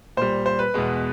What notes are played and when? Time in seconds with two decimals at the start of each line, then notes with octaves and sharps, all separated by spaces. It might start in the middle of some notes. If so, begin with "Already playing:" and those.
0.17 A#2 G3 C5
0.46 C5
0.59 B4
0.74 E2 B2 G#3